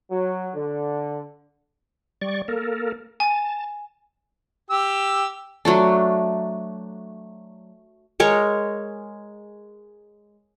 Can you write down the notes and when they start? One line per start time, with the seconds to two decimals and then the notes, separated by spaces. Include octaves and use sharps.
0.11 F#3
0.55 D3
2.21 G3 D5 C#6
2.48 A#3 A4 A#4
3.20 G#5 A5
4.70 G4 E6
5.65 F#3 A3 D4
8.20 G#3 A#4 C#5